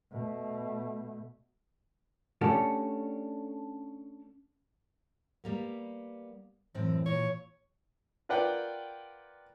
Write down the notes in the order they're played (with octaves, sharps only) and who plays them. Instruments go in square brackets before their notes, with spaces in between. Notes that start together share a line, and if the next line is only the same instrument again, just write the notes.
[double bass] B2 A3
[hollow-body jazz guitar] A3 C#4 D4 F#4 G4 A4
[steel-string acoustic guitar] G3 A#3 B3
[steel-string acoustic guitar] F#2 A2 C4 [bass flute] E3
[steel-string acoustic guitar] A#2 [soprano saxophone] C#5
[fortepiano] F4 A#4 B4 D5 F#5 G5